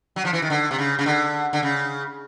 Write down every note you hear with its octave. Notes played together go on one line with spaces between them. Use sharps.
F#3
F3
E3
D#3
D3
C3
C#3
C#3
D3
D3
C#3